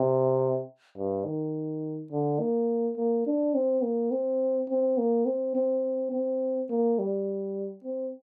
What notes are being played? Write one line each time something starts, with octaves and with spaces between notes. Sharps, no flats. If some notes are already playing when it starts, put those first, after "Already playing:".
Already playing: C3
G2
D#3
D3
A#3
A#3
D4
C4
A#3
C4
C4
A#3
C4
C4
C4
A#3
G3
C4